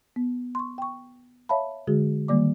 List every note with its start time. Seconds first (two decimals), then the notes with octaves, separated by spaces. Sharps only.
0.16 B3
0.55 C6 C#6
0.78 G5 C#6
1.49 C#5 E5 F5 A5 B5
1.87 D3 G#3 F#4 G#4
2.28 D#3 G3 A#3 D5 D6